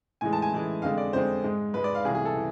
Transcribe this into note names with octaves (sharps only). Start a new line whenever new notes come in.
A2 E3 G#3 G#5
A5
G#5
A2 E3 G#3
F2 D3 G#3 F5
D5
F2 D3 G#3 C5
G#2 G#3
G#2 G#3 B4
D5
F5
C2 C3 E3 A3 G#4
G#4
A4
E3 A3